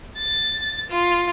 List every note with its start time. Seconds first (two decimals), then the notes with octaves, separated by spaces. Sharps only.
0.17 A6
0.90 F4